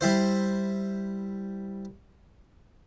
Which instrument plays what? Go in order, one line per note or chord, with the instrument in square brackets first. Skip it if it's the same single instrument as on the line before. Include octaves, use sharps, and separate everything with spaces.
[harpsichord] G3 E4 C5